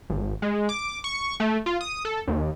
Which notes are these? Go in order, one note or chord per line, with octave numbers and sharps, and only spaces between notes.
G#1
G#3
D6
C#6
A3
F4
D#6
A4
D#2